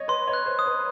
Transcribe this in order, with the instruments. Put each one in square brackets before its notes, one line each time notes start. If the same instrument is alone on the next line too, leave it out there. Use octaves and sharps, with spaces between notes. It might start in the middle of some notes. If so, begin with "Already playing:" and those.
Already playing: [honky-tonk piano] C#5 D#5
[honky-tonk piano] B4 [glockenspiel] C6
[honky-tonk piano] C#5
[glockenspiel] F#6
[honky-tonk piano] C5
[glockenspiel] D#6
[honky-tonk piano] B4